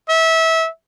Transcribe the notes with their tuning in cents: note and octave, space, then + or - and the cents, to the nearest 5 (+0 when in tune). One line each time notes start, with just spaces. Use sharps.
E5 -25